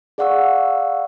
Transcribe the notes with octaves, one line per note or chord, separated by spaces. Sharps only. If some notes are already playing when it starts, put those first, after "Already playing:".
G#4 D5 F5 F#5 C#6 E6